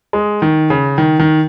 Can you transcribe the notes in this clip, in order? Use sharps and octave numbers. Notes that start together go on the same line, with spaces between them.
G#3
D#3
C#3
D#3
D#3